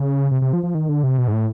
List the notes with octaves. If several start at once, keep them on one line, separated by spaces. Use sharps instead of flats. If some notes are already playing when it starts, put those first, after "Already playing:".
Already playing: C#3
C3
C3
F3
F3
D#3
D3
C3
B2
G#2
A2